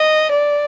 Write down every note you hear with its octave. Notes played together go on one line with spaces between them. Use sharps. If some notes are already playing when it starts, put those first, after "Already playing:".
Already playing: D#5
D5